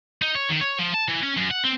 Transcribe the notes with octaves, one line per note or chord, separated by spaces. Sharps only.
D#4
C#5
D#3
C#5
F3
A5
E3
C#4
F#2
F#5
C4